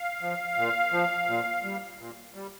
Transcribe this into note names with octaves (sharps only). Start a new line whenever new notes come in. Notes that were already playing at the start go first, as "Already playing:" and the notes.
Already playing: F5
F3
A#2
F3
A#2
G3
A#2
G3